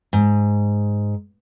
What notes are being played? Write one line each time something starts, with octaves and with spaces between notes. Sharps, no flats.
G#2